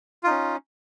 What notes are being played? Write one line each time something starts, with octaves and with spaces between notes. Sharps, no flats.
C#4 D#4 F4